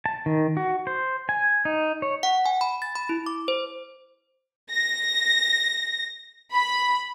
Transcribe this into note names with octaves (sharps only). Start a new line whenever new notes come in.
A5
D#3
F#4
C5
G#5
D#4
C#5
F#5
G#5
B5
A6
B5
E4
D6
C5
A#6
B5